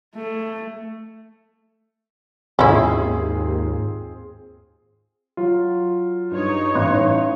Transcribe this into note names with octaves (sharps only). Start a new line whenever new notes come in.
A3
D#2 G#2 C4 C#4 E4 F4 G#4
F#3 F4
G2 D#4 C#5
A1 C6 F#6